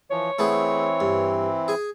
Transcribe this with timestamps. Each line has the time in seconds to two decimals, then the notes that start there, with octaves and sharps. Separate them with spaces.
0.11 E3 F3 C#5
0.39 E3 A3 B3 C4 E4 G#4
1.00 G2
1.68 G#4 G#5